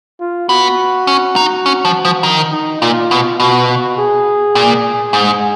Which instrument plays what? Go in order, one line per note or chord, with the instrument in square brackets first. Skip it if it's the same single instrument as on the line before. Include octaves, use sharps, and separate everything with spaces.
[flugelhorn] F4
[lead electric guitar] B3 [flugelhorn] F#4
[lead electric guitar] C#4
D#4
C#4
F3
F3
D#3
[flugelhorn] D#4
[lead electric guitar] A#2 [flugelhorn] F4
[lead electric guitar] B2
[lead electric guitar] B2 [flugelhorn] F#4
[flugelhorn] G#4
[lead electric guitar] A#2
G#2